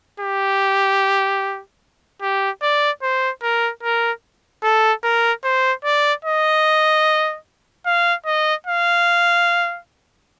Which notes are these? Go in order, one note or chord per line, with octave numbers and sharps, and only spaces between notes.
G4
G4
D5
C5
A#4
A#4
A4
A#4
C5
D5
D#5
F5
D#5
F5